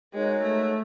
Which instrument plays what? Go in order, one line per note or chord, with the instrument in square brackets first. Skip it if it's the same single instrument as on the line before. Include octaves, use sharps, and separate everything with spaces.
[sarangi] G#3 [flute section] D#4 F#4 A#4 C#5
[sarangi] A3